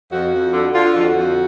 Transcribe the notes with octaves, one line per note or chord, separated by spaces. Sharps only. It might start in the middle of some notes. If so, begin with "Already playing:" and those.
F2 F#4
F2
D3
D3 F4
F2
F4
F#4
F2